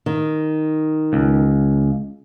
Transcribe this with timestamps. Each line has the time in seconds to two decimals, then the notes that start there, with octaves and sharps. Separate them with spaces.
0.06 D#3
1.13 C#2